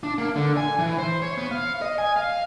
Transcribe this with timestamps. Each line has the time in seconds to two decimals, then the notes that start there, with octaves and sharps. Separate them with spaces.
0.03 D4
0.18 A#3
0.36 D3
0.57 G#5
0.79 E3
0.98 C5
1.22 C#5
1.38 B3
1.51 F5
1.82 D#5
1.98 G#5
2.16 F5